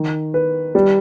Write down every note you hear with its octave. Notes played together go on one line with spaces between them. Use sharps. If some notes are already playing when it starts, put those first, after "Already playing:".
Already playing: D#3
B4
G3